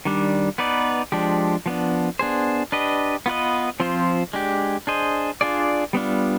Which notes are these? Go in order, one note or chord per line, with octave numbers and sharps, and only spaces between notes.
D#3 G3 D4
B3 D#4 B4 D5
F3 G#3 D4 G4
F3 B3 D4
B3 D4 G#4 C5
D4 G4 B4 D#5
B3 F4 B4 D#5
F3 C4 F4 C5
G#3 D4 G4
D4 G#4 C5 D#5
D4 F4 G#4 D5
G3 B3 D4 F4